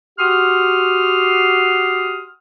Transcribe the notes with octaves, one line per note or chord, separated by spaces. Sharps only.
F#4 G4 F#5 C6 D#6 F6